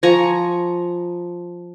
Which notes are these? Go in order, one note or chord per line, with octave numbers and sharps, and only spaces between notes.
F3 G#5 A#5 C#6